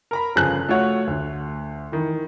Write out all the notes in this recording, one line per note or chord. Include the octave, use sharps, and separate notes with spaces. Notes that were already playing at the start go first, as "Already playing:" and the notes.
A#4 A#5 B5
G1 C#3 F3 G#4 A5 F#6
A3 F4 F#4 C#5 F#5
D2
D#3 E3